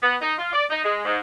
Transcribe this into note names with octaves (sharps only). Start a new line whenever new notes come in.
B3
D#4
F4
D5
D#4
G#3
G#2